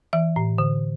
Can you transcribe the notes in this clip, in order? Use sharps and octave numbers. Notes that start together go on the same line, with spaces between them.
E3 E5
A2
D3